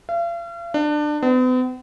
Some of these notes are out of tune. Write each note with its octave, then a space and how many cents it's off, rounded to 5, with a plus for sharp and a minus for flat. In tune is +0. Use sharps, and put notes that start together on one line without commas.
F5 -40
D4 +25
B3 +45